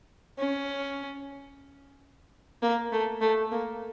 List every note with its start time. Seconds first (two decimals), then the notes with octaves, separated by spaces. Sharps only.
0.39 C#4
2.62 A#3
2.92 A3
3.21 A3
3.51 A#3